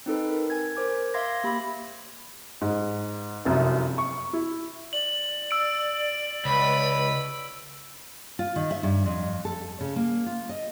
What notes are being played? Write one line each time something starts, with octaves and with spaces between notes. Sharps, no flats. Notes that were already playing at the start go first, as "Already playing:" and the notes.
C4 D#4 A4 B4
A#4
G#5 G#6
A#4 C5 D6 G#6
E5 F5 C6 D6 G#6 A#6
A#3 G4 B5 A#6
G#2
F1 C2 F#2
C#6
E4
D5 F#7
E6 D7
C#2 B4 B5
F4
D#3
E5
G2
F2
A4
C#3
A#3
F4
D#5